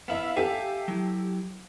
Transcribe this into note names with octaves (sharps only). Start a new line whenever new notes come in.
B3 E4 E5 F5
G4 A4 E5 F5 G#5
F#3 E4